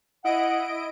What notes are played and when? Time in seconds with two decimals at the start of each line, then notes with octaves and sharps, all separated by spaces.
0.24 E4 D#5 F#5 D7